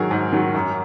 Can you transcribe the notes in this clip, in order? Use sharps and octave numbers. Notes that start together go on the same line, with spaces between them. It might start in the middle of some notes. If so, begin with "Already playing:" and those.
Already playing: G#2 D#3 F#3 G#4 A#4
G#2
D#3 F#3
F#2